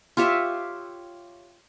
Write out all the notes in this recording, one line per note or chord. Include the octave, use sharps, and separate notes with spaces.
F4 G4 C#5 E5